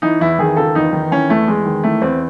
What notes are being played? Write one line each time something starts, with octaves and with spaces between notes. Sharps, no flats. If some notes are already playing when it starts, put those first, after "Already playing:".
E3 D#4
E2 E4
D#3 G#4
C#2 A4
E2 D#4
D#3
E3 C#4
E2 A3
E2 G#3
D#3
E3 A3
E2 C4